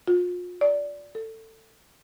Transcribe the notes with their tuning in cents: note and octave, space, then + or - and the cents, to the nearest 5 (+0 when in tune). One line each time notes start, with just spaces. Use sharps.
F4 +35
D5 -15
A4 +20